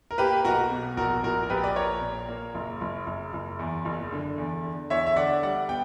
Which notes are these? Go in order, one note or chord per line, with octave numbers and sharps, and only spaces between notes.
A#4
A#3 G4 B4
B1 F#4 A#4
B2
A#1 F#4 A#4
A#1 F#4 A#4
A#4
A#1 G4 B4
D5
A#1 A#4 C#5
A#2
A#3
F#1
F#1
F#1
F#1
E2
F#1
D3
E2
D3
E2 C#5 E5
E5
D3 D5 F#5
G3 D5 F#5
B3 G5